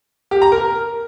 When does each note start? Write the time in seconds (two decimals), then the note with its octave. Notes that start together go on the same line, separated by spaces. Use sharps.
0.31 G4
0.42 A#5
0.52 A#4